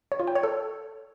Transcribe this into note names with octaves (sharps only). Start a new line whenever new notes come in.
C#5
F4
G5
C#5
A4